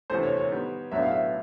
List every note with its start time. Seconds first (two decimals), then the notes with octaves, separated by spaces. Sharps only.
0.10 D2 C3 E3 A3 C5
0.23 C#5
0.37 C#5
0.51 D#3 G3 B3
0.92 B1 A2 F#3 B3 D4 E5
1.02 F5
1.11 E5